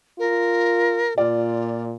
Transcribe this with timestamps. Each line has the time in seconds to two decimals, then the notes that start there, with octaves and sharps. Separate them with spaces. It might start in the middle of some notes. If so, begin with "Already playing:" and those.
0.19 F4 A#4
1.18 A#2 F4 D5